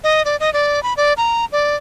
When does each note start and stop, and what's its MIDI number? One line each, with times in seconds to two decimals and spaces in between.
0.04 0.22 75
0.25 0.36 74
0.40 0.52 75
0.53 0.82 74
0.83 0.93 83
0.97 1.13 74
1.17 1.45 82
1.52 1.75 74